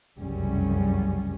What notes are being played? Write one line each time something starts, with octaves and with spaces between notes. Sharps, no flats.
F1 C2 F#2 C#3 G3 C#4